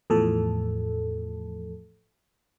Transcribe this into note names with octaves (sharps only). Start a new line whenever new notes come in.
E2 A2 F3 A4